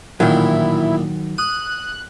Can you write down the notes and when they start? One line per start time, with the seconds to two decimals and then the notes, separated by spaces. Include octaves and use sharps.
0.20 A1 A#2 D#3 F#3 E4
1.38 D#6 F#6